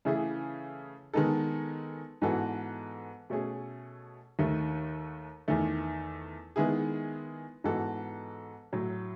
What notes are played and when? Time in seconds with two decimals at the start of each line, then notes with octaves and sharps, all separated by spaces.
0.05 C#3 E3 A3 E4 G#4
1.14 D#3 G#3 B3 D#4 A4
2.22 G#2 E3 B3 F#4 A4
3.30 B2 A3 C#4 G#4
4.39 D#2 D#3 A3
5.48 E2 D#3 A3
6.56 D#3 G#3 B3 E4 G#4
7.64 G#2 E3 B3 F#4 A4
8.73 A2 F#3 A3